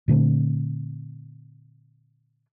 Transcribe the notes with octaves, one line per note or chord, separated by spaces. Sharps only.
A#2 D3 A3 C4